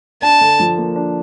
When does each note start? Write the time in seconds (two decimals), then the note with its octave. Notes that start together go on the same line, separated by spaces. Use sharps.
0.22 D4 A5
0.41 D3
0.59 F3
0.78 A#3
0.96 D4